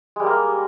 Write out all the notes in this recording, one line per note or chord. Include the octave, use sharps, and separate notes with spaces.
G3 G#3 A#3 A#4